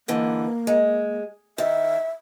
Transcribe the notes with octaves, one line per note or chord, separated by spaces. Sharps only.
G#2 D3 E3 A#3
G#3
D#3 E5